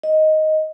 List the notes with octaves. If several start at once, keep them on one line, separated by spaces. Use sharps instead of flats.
D#5